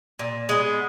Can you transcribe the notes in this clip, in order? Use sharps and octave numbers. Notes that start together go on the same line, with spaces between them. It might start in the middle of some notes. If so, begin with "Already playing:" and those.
A#2
G#3 B3